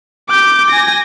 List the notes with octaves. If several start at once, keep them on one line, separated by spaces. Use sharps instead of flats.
D6 G6
G#5 A#6